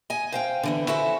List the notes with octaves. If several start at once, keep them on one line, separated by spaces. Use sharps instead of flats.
D#5 G#5
C5 F5 G5
D3 E3 B3
C#4 E4 F#4 A4 C5